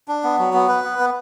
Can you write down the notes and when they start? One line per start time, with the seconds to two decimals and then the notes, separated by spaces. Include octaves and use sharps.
0.08 D4
0.24 B3
0.39 F#3
0.54 B3
0.68 B4
0.84 B3
0.99 B3